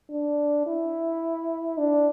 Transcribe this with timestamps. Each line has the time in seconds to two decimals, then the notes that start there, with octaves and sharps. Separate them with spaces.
0.10 D4
0.67 E4
1.78 D4